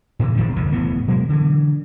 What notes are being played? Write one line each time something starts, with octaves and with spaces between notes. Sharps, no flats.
A2 C3 E3
E1 D#3 F3 C4
C2 F2 D3 D#3
F1 A2 E3 B3
B2 F#3 G#3 A#3
D3 E3